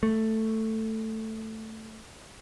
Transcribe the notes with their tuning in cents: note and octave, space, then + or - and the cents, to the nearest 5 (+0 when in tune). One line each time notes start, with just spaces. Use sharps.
A3 +5